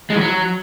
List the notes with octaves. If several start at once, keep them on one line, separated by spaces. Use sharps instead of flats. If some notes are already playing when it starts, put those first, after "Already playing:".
G#3
E3
F#3